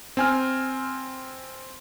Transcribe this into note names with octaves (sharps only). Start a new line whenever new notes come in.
C4 G#5 F6